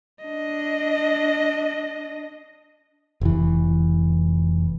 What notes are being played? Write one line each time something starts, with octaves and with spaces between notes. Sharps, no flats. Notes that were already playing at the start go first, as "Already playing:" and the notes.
D4 D#5
F1 E3